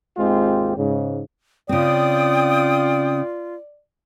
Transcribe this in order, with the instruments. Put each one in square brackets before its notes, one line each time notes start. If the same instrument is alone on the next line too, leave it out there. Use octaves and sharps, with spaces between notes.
[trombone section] G#1 D#2 G#3 C4 F4 G4
G#2 C#3
[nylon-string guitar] C#3 C4 [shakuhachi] F4 [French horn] D5 [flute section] G5 D#6